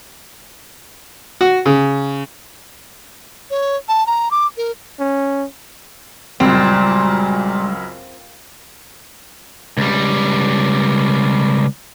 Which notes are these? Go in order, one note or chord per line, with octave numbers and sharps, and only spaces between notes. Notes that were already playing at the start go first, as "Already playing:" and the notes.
F#4
C#3
C#5
A5
A#5
D6
A#4
C#4
C#2 F#2 A#2 G3 G#3 C4
C#2 G3